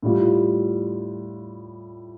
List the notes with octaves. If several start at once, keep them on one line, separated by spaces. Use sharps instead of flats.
A2 G3 F4